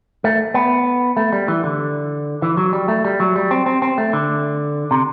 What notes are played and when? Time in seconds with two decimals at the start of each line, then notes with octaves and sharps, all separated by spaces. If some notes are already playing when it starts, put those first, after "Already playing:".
0.24 A3
0.54 B3
1.17 A3
1.33 G3
1.48 E3
1.64 D3
2.42 E3
2.57 F#3
2.73 G3
2.88 A3
3.05 G3
3.20 F#3
3.36 G3
3.51 C4
3.66 C4
3.82 C4
3.98 A3
4.13 D3
4.91 C3